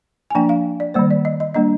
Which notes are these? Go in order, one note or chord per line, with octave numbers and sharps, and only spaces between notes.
G#5
F3 A#3 D4 G5
F5
D5
D#3 G3 A#3 C5
D5
D#5
D#5
G3 A#3 D4 D#5